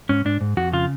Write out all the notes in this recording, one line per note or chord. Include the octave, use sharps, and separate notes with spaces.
G#2 C#4
G#2 D4
G#2
F2 F#4
C#3 F4